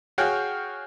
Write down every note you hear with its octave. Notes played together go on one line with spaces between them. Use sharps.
F#4 G#4 C#5 F5 G5